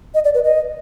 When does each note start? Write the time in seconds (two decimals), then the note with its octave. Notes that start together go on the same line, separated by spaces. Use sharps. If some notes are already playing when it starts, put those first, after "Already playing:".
0.14 D#5
0.24 D5
0.34 B4
0.44 D#5